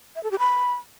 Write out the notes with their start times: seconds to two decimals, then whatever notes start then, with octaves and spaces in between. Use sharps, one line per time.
0.16 E5
0.23 A4
0.31 G4
0.39 B5